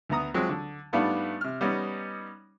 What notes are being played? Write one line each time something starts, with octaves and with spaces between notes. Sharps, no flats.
D2 B3 A#5 D#6
F3 F#3 G#3 C4
D3
G#2 G3 A3 B3 D4 F4
C3 F6
G3 B3 C#4 D#4